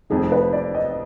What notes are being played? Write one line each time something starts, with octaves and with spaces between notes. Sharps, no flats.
F1 F2 D#3 G#4
B4
D5
D#5